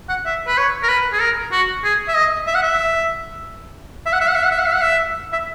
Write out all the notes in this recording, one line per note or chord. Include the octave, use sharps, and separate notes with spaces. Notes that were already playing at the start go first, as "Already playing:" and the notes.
F#5
E5
B4
C#5
A#4
B4
G#4
A#4
F#4
G#4
E5
D#5
E5
F#5
E5
E5
F#5
E5
F#5
E5
F#5
E5
F#5
E5
F#5
E5
E5